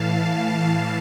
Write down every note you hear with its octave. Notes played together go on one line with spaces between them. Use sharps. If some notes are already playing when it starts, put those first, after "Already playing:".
Already playing: A2 E3 F5 A5
A5